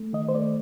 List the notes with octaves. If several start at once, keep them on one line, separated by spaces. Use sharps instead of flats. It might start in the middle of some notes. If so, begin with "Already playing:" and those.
Already playing: A3
D#3 D#5
C5
A3 D5